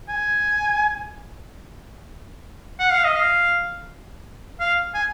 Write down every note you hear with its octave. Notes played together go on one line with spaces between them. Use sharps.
G#5
F#5
F5
D#5
F5
F5
G#5